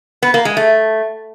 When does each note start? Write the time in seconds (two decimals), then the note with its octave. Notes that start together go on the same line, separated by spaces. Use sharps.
0.23 B3
0.34 A#3
0.45 G#3
0.57 A3